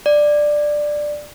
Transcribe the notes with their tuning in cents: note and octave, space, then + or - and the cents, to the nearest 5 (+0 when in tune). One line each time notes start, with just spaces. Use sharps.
D5 +10